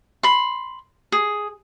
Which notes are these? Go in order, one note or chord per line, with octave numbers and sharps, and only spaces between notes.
B5 C6
G#4